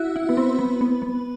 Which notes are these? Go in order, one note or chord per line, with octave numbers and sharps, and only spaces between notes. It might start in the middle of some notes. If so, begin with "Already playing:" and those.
Already playing: E4 F#4
E4
B3
C4
B3
B3
B3